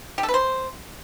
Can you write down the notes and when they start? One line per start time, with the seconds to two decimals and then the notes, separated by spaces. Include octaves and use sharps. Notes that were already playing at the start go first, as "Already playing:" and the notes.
0.18 G4
0.23 A4
0.29 B4
0.34 C5